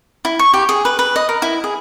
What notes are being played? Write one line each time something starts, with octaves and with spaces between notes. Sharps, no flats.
E4
C#6
G4
G#4
B4
B4
D#5
A#4
E4
G#4